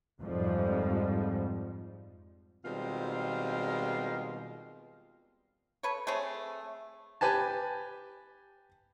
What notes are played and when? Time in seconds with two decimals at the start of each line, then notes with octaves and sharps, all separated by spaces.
0.20 F2 G#2 F3 G3
2.65 B2 D#3 G3 G#3 C4 F4
5.83 A4 B4 C#5
6.07 A3 C4 G#4 C#5
7.21 G4 B4 G#5 A5